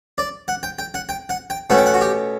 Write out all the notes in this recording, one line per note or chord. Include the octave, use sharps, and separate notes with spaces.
D5
F#5
G5
G5
F#5
G5
F#5
G5
B2 A3 C#4 F#5
G5
F#5
F#4
G4